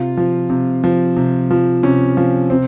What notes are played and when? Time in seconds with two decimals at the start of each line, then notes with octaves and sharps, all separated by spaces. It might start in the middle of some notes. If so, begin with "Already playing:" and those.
Already playing: C3 F4
0.17 F3
0.50 C3
0.84 F3
1.17 C3
1.51 F3
1.83 C3 C#4
2.17 F3
2.50 C3 C4